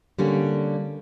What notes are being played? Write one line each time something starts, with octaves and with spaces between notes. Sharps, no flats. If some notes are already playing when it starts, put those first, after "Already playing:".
D3 G3 A#3 C#4